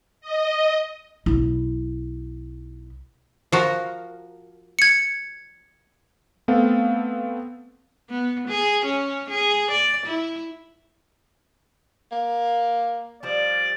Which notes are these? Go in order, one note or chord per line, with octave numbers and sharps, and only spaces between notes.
D#5
B1 E4
F3 F#4 A#4
G#6 C#7
A3 B3 C4 A4 F5
B3
G#4
C#4
G#4
D5
E4
A#3
F3 G3 D5